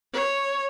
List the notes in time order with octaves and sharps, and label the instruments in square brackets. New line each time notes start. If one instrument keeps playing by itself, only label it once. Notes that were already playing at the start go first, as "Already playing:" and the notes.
[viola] C#5